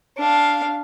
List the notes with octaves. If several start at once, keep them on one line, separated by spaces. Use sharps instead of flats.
D4 F5